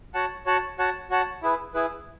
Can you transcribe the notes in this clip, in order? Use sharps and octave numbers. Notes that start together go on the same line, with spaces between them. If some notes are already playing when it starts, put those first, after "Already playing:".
F#4 C#5 F#5 A5
F#4 C#5 F#5 A5
F#4 C#5 F#5 A5
F#4 C#5 F#5 A5
E4 G#4 B4
E4 G#4 B4